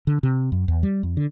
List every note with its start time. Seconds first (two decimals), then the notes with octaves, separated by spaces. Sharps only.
0.07 D3
0.23 C3
0.52 F#2
0.68 E2
0.83 G3
1.03 F2
1.17 D3